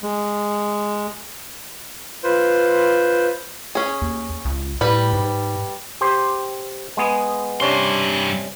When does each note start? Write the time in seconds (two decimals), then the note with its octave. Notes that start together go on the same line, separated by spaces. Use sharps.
0.03 G#3
2.24 F4 B4 C5
3.75 C#4 G#4
4.02 D#2
4.45 C#2
4.81 A2 G3 B4
5.13 G#2
6.01 G4 C5
6.97 G#3 B3 G#4
7.60 G2 C3 C#4 D4 C6